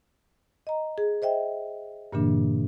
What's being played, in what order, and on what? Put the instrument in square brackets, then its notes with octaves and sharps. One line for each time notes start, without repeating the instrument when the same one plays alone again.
[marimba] D#5 A#5
G#4
C5 D#5 E5 G5
G2 A#2 D3 E3 A#3 D4